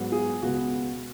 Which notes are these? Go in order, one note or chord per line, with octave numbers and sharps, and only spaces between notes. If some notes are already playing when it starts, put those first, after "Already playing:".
Already playing: G#2 F#3 B3
G#4
C#2 B2 G#3 B3 F#4